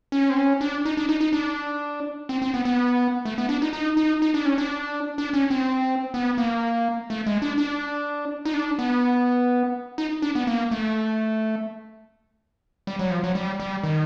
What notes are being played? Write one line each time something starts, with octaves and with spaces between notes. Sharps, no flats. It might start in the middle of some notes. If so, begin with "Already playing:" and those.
C#4
C4
C#4
D4
D#4
D4
D#4
D#4
D4
C4
C4
B3
B3
A3
B3
D4
D#4
D#4
D#4
D#4
D4
C#4
D4
D4
C#4
C4
B3
A#3
A3
G#3
D4
D4
D#4
D4
B3
D#4
D4
B3
A#3
A3
G3
F#3
F3
F#3
G3
G3
D#3